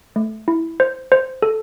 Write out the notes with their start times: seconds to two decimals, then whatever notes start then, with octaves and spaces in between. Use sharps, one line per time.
0.16 A3
0.48 E4
0.80 C5
1.12 C5
1.42 A4